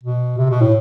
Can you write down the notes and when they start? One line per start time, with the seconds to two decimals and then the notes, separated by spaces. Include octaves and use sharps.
0.03 B2
0.38 C3
0.50 B2
0.61 A2